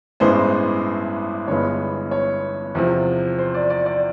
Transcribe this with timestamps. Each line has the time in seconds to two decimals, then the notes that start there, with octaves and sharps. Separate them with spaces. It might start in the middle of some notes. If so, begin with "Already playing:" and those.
0.20 A1 G2 E3 G#3 B3 C5
1.47 G1 G2 E3 G#3 B3 C#5
2.11 C#5
2.75 E2 C3 F3
3.38 C5
3.54 D5
3.70 D5
3.86 D5